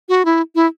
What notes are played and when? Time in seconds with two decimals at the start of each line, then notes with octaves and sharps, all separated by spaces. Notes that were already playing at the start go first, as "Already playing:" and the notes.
0.09 F#4
0.25 E4
0.55 E4